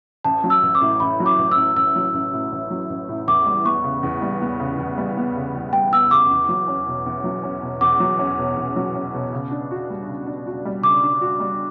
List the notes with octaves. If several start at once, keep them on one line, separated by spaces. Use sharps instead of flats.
A1 A5
F#3
E6
A1
D6
A2
A1 B5
F#3
D6
A1
E6
A2
A1 E6
F#3
A1
A2
A1
F#3
A1
A2
E2 D6
G3
B3 C#6
C#3
E2
G3
B3
C#3
E2
G3
B3
C#3
E2
G3 G5
B3 E6
C#3 D6
E2
F#3
C#4
B2
E2
F#3
C#4
B2
E2 D6
F#3
C#4
B2
E2
F#3
C#4
B2
C#3
D4
F#4
G3
C#3
D4
F#4
G3
C#3 D6
D4
F#4
G3